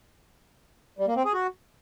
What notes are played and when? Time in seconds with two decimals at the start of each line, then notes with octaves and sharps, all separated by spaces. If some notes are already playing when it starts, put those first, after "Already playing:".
0.99 G3
1.07 A#3
1.16 C4
1.25 G#4
1.34 F#4